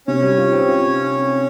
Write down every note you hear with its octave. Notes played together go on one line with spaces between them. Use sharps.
C3 C#4 C#5
G3
F4
C4
F4